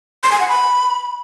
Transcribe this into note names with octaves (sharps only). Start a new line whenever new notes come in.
C6
G#5
F#5
B5